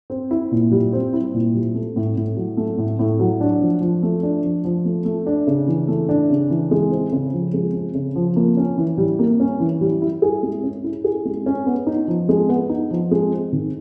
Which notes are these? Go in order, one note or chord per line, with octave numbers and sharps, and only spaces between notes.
C4
E4
A#2
G3
C4
E4
A#2
G3
A3
A2
A2
F#3
A3
A2
A2
F#3
D4
F3
F3
A3
D4
F3
F3
A3
A3
D4
C#3
E3
A3
D4
C#3
E3
G#3
C4
C#3
F3
G#3
C4
C#3
F3
A#3
C#4
E3
G3
A#3
C#4
E3
G3
E4
G#4
G#3
C#4
E4
G#4
G#3
C#4
B3
D#4
F3
G#3
B3
D#4
F3
G#3
C4
D#3